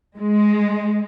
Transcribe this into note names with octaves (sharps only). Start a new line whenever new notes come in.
G#3